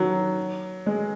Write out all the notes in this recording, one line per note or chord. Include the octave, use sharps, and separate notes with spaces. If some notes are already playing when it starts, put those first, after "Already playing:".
Already playing: D#3 F#3
G#3